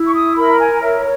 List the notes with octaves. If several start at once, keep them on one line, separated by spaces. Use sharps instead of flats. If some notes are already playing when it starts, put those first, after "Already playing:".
Already playing: E4
C#6
D#6
A#4 B5
G#5
C#5 E5